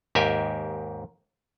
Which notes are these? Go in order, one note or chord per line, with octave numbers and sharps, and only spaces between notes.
D#2 G#2 G4 A#4 E5 G#5